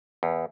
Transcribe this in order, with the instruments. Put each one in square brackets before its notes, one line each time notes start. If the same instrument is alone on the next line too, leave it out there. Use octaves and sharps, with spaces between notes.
[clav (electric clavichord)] E2